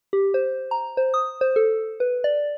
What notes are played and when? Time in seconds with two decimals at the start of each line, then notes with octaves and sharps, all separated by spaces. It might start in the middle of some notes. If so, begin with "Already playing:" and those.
0.13 G4
0.34 C5
0.71 A#5
0.97 C5
1.14 D#6
1.41 C5
1.56 A4
2.00 B4
2.24 D5